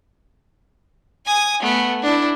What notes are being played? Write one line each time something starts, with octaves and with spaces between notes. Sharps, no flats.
G#5 D#6
A3 B3
D4 E4